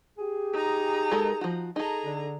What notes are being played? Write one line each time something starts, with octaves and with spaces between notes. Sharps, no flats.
G4 G#4
D#4 A#5
G#3 A4 A#4
F3 F#4
D#4 G#4 A4 A#5
D3